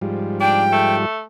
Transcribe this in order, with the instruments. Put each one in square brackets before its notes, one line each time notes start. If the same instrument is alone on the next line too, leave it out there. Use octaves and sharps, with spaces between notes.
[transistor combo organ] G#2 F3 G3
[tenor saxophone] D4 [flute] G5
[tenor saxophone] A3